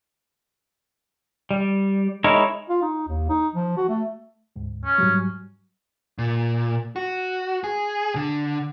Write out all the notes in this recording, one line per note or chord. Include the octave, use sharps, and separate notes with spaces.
G3
G#3 D#4 E4 A#4 C#5
F4
D#4
D#2
D#4
F3
F#4
A3
D2 G#2
C#4
G#2 F#3 G3
A#2
F#4
G#4
D3